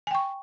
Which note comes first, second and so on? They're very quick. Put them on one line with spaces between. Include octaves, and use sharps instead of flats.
G#5 G5 C#6